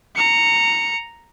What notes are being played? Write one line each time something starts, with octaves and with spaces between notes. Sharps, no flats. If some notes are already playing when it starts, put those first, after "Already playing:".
A#5 C#7